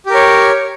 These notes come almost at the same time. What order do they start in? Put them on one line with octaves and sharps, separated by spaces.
G4 A#4 C#5